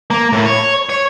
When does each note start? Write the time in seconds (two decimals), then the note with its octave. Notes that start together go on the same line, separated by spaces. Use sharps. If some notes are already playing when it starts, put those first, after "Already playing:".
0.10 A#3
0.32 A2
0.45 C#5
0.89 C#5